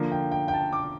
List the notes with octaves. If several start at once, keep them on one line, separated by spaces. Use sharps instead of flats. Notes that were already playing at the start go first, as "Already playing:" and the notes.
Already playing: D3 F3 A#3
G5
G5
G5
A5
D6